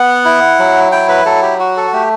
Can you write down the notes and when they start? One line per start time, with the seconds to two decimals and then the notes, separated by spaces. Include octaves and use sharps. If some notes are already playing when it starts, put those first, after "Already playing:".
Already playing: B3 F#5
0.25 E4
0.59 F#3
0.92 E4 G5
1.09 B4
1.25 F#3 A4
1.42 G4
1.60 F#4
1.77 A4
1.93 A3 G4